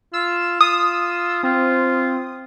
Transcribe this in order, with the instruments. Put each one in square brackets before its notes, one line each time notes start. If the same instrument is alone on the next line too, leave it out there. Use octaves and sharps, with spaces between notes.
[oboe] F4 [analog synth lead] E6
[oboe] F4 [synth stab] D#6
[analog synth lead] C4 [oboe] F4